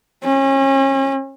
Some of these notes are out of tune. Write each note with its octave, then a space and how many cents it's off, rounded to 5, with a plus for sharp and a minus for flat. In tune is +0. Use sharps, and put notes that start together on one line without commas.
C#4 -35